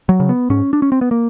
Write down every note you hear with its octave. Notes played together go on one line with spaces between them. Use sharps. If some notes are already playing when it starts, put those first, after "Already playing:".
F#3
C#3
B3
G#2 C#4
D4
C#4
C4
B3
A#3